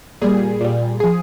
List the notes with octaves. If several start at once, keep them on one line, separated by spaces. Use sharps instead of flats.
A#2 G3 G#4
A#2 G3
F3 G#4